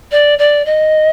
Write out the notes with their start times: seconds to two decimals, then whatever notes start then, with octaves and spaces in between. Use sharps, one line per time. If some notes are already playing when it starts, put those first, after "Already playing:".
0.12 D5
0.38 D5
0.65 D#5